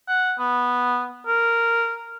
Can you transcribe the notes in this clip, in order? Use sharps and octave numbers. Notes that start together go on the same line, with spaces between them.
F#5
B3
A#4